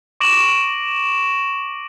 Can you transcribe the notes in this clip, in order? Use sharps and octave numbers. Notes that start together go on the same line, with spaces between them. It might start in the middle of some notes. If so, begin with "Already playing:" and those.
C#6 D6 A#6 D7 E7 F#7